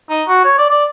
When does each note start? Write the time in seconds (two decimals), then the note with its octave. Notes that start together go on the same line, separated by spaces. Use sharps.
0.09 D#4
0.28 F#4
0.44 C#5
0.58 D5
0.70 D5